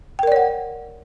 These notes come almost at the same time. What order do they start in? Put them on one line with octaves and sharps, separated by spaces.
G5 A#4 D5 C#5 F#5